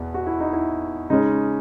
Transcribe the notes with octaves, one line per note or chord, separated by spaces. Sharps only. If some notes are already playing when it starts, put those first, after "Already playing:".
Already playing: E2 B2
F#4
E4
D#4
E4
C#3 G#3 C#4 D#4